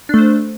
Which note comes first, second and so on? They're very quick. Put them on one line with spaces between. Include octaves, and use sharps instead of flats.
D4 A3 C5